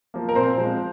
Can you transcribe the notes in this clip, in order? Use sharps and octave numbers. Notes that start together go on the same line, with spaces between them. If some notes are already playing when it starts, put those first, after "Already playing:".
F3 A#3
A#4
A#2 C4 C5
F3 G#3 C4